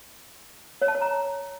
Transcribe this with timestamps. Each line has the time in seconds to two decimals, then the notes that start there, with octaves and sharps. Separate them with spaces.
0.82 C#5
0.88 A5
0.95 C#5
1.01 A#5